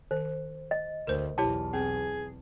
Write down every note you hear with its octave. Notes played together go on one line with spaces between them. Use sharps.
D#3 C5
D#5
D2 A#4 C5
B1 E2 E4 G4 C#5 A5
C4 G#4